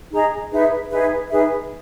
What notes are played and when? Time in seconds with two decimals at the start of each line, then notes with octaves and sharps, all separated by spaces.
0.12 D#4 G#4 D#5 A#5
0.51 D#4 G#4 B4 E5
0.91 D#4 G#4 B4 E5
1.30 D#4 G#4 B4 E5